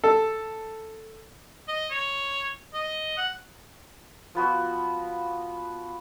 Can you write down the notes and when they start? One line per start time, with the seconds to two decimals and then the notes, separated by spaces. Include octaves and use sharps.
0.04 A4
1.68 D#5
1.91 C#5
2.74 D#5
3.17 F#5
4.35 F3 B3 F#4